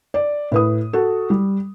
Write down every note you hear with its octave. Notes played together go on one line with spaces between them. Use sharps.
D5
A2 B4 D#6
F#4 A4
G3